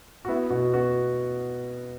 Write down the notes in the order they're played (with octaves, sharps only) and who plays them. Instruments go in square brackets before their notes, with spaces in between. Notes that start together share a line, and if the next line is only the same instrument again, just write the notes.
[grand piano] F#4
B3 E4
B2 F#4
B3 F#4